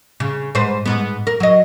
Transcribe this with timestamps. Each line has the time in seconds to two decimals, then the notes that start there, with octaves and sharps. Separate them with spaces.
0.20 C#3
0.55 G#2 B4 C5
0.86 G#2 B3
1.27 A#4
1.40 F#3 D#5